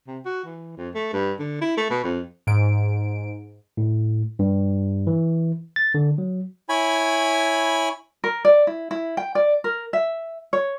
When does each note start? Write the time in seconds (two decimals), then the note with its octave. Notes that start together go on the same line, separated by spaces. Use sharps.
0.07 C3
0.25 F#4
0.45 E3
0.77 F2
0.95 A3
1.13 G2
1.40 D3
1.61 E4
1.77 A3
1.90 B2
2.04 F2
2.47 G#2 D7
3.77 A2
4.39 G2
5.07 E3
5.76 A6
5.94 D3
6.18 F#3
6.69 E4 C#5 G#5 B5
8.24 A#4
8.45 D5
8.67 E4
8.91 E4
9.17 G5
9.35 D5
9.64 A#4
9.93 E5
10.53 C#5